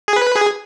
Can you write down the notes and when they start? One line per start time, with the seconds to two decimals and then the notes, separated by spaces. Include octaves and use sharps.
0.08 G#4
0.16 B4
0.36 G#4